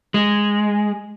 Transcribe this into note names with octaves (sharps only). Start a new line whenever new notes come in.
G#3